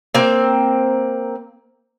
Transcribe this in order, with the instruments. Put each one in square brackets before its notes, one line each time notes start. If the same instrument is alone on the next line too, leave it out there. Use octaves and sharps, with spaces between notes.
[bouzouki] A#3 C4